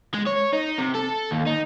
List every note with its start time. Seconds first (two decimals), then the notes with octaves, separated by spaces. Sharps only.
0.15 G#3
0.27 C#5
0.53 D#4
0.79 C3
0.95 A4
1.31 D#2
1.46 D#4